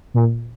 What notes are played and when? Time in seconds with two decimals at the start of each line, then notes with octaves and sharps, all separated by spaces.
0.14 A#2